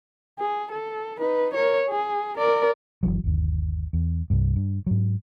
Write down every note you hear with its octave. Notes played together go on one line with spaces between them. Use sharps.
G#4
A4
D#4 B4
A#4 C#5
G#4
A#4 D5
G1 C2 E3 F#3
G1 D#2
E2
C2 G2
G2
G#2 F#3